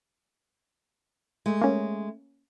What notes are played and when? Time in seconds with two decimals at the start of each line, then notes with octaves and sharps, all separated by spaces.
1.46 G#3 A3
1.62 A#3 C#4